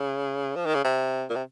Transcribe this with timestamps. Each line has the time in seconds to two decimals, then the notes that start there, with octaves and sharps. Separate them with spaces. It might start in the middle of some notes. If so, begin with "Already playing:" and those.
Already playing: C#3
0.56 F3
0.66 D#3
0.75 C#3
0.85 C3
1.30 A#2
1.36 C3